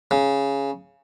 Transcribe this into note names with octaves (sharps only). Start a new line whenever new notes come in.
C#3